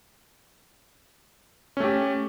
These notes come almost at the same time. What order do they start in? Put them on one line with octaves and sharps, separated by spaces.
C#4 A3 G4